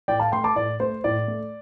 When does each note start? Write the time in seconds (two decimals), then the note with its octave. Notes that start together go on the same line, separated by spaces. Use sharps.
0.08 A2 D5 G5
0.20 F5 A5
0.32 A3 G5 C6
0.44 A5 D6
0.56 A2 D5
0.80 A3 C5
1.04 A2 D5
1.28 A3